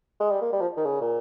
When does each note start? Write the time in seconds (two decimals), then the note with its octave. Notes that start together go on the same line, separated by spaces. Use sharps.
0.20 G#3
0.31 G3
0.42 A#3
0.53 G3
0.61 F3
0.77 D#3
0.85 C#3
1.01 A#2